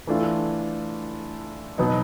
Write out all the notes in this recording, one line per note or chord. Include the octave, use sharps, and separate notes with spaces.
E3 A3 D4 F4
B2 F#3 B3 D#4